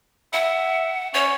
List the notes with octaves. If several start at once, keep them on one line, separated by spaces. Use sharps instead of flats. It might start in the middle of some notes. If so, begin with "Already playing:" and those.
E5 F#5
C#4 C#5